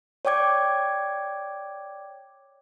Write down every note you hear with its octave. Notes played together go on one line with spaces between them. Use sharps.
C#5 D5 G5 D6 G#6